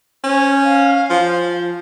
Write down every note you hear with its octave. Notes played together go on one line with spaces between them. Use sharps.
C#4 C5
F5
F3